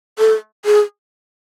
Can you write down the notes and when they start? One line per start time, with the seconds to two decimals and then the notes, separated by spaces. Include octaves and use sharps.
0.19 A4
0.65 G#4